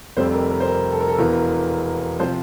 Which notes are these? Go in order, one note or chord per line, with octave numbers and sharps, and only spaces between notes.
F1 F2 C3 G3 C5
A#4
A#4
C5
A#4
A4
A#4
A4
E1 E2 E3 A#4
C3 F3 C5